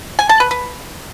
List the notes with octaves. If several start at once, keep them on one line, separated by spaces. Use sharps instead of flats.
G#5
A5
B4
B4